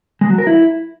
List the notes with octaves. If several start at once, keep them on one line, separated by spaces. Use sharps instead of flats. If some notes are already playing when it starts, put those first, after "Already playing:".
G#3
F#3
A#4
E4